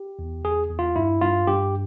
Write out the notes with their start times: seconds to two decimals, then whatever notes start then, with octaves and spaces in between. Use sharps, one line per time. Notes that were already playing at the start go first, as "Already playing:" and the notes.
Already playing: G4
0.19 E2
0.45 E2 G#4
0.70 E2
0.79 F4
0.96 G2 E4
1.21 G2 F4
1.47 G2 G4